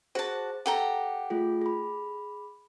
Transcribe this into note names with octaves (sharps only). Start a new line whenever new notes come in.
F#4 G#4 C5 A5
G4 A4 F#5 A#5
A3 F4 G#4
G#4 B5